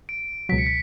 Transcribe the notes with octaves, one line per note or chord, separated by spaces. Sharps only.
D7
C#2 B2 F#3 B6
C#7
B6